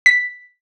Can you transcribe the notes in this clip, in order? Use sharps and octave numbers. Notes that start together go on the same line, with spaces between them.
B6